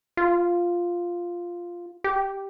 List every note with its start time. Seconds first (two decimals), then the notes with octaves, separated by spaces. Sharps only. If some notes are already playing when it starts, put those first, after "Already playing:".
0.17 F4
2.04 G4